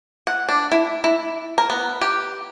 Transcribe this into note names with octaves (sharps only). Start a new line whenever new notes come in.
F#5
D4
E4
E4
A#4
B3
G4